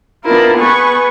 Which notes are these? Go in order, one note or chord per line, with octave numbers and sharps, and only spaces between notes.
B3 D4 E4 F4 A#4
B3 G#4 B4 C#6